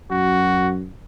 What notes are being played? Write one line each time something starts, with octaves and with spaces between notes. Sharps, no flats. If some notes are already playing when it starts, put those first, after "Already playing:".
F#2 F#4